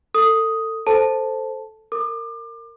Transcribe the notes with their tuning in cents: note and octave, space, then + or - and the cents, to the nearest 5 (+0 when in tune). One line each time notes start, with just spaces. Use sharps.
A4 +25 D#6 +5
A4 +0 C5 +0 A5 +0
A#4 -25 D6 +30